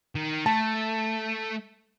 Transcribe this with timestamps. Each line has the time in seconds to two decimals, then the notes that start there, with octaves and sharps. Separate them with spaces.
0.15 D#3
0.46 A3 A5